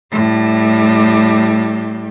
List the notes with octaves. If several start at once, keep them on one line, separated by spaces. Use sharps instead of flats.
A2 G3